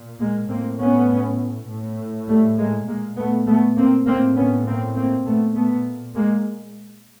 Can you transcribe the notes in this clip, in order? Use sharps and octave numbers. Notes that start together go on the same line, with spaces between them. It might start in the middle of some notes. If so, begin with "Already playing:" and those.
Already playing: A#2
G#3 A#3
A2 A#3 C4
B3 C#4
A2
G3 A3
G#3 A#3
A#2 G#3 A#3
A3 B3
A3 B3
A#3 C4
A2 A#3 C4
B3 C#4
A#3 C4
A#3 C4
A#2 A3 B3
A3 B3
G#3 A#3